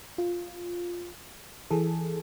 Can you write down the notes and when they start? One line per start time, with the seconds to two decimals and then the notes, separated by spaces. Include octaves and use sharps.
0.18 F4
1.70 E3 G#4 A4